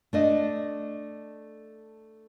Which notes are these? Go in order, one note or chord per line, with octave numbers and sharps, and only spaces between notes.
A3 D4 D#5